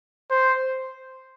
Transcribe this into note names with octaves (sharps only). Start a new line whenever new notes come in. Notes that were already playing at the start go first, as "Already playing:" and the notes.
C5